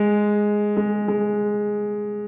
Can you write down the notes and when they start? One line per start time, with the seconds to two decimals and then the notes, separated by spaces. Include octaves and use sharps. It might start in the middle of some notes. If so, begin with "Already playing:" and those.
Already playing: G#3
0.77 G#3
1.08 G#3